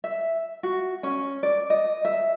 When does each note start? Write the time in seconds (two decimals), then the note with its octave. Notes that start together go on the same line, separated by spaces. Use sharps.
0.04 E5
0.63 F#4
1.03 C#4
1.43 D5
1.70 D#5
2.05 E5